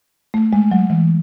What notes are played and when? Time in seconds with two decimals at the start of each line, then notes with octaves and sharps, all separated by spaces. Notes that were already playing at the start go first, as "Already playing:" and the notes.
0.34 A3
0.53 G#3
0.71 F#3
0.90 E3